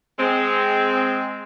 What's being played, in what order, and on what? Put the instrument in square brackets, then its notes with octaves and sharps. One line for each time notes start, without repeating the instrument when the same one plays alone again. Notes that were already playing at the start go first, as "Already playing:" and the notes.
[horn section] G#3 C4